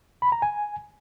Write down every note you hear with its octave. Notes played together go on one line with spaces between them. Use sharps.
B5
A#5
G#5